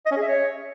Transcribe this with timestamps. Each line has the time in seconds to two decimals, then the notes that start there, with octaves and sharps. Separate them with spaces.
0.06 D#5
0.11 C#4
0.17 G#4
0.22 E5
0.28 C#5